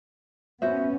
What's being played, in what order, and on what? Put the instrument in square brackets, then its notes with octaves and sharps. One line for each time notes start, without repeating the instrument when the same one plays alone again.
[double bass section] B3 C#4 [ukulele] F#4 C5 E5